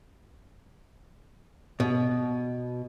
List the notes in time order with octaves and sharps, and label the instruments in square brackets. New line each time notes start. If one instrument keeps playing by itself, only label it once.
[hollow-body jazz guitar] B2